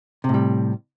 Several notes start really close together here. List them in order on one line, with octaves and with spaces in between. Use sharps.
C3 A2 G3